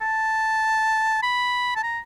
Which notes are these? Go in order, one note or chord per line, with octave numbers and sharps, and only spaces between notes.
A5
B5
A5
A#5